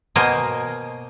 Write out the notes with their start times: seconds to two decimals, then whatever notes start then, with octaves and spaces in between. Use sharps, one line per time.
0.16 B2 A#3 C5 D#5 G#5 A#5